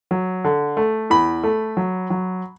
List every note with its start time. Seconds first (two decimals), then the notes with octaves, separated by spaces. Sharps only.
0.11 F#3
0.44 D3
0.77 A3
1.10 E2 B5
1.43 A3
1.77 F#3
2.10 F#3